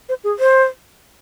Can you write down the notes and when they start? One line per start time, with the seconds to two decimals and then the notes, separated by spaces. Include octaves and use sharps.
0.09 C5
0.24 G#4
0.39 C5